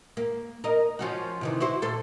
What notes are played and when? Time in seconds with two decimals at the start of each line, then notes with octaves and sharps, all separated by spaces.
0.17 A#3
0.64 A#4 D#5
0.99 F3 C#4 F#4
1.41 C3 D#3 E3
1.60 E4 F#4 C5
1.82 A#2 A4 C5